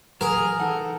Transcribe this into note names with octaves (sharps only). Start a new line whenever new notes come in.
E3 F#3 G#4 A#4
E3 D#4 A4 F#5